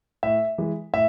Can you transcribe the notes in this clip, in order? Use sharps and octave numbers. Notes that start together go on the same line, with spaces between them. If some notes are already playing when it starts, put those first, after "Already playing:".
A2 E5
E3 G#3
A2 E5